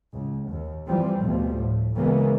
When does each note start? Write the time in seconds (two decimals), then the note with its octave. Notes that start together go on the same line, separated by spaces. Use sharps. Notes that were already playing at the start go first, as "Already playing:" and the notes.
0.13 C#2
0.48 D#2
0.87 E3 F3 G3 C4
1.21 D2 B2 F3 G3
1.57 A2
1.96 C#3 E3 G#3 A#3 B3